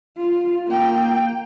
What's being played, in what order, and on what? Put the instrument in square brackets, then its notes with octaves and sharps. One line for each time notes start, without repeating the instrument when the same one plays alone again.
[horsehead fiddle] F4
A#3 G5